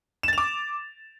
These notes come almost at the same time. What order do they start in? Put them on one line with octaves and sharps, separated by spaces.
E7 A6 F7 D6